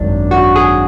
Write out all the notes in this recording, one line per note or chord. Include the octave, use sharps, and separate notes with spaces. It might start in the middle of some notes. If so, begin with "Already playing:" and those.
Already playing: G#1 F#2 D4
F#4
G#4